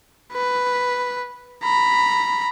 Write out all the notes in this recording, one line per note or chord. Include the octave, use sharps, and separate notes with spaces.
B4
A#5 B5